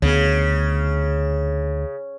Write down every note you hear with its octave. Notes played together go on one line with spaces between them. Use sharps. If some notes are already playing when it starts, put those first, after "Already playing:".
D2 C#3 B3